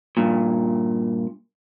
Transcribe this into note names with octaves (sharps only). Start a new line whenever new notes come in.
G2 A#2